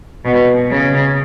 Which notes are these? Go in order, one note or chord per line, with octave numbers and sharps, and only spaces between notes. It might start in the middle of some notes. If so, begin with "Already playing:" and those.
B2
C#3